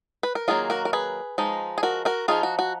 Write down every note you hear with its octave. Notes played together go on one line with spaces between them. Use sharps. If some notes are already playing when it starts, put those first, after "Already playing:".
B4
A#4
D#3 F#3 A#3 F4 G#4
F#4 A#4
A#4
G#4 B4
F3 G#3 D#4
G#4
F#4 A#4
F#4 A#4
F3 G#3 D#4 F4 G#4
F#4
F#4